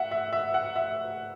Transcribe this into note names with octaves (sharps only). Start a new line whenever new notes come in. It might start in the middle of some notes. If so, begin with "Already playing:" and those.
Already playing: E5 F#5
E5
E5
F#5
E5